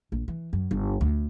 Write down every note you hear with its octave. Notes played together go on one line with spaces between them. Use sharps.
A#1
E3
F#2
G1
D2